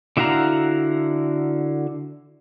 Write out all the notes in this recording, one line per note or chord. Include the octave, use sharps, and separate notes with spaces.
D3 E4 F#4 F5 A#5